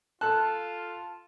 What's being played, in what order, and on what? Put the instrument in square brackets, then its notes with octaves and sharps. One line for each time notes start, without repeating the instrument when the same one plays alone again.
[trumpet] F4 [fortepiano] A4 F#6 [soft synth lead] A5